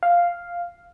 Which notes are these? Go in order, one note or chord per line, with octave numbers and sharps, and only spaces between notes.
F5